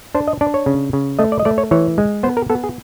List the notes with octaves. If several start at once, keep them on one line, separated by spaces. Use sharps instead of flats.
D4 C5
D#5
D4 D5
C#5
C#3
C#3
A3 D#5
D5
D#5
A3 D5
C#5
E3 C#5
G#3
B3 C5
A#4
B3 A4
G#4